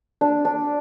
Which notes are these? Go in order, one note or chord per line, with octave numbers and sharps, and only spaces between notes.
D4
D4